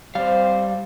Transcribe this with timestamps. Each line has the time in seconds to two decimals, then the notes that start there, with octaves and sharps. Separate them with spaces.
0.15 G3 C4 C5 F5